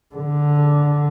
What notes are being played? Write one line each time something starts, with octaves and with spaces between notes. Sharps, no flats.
D3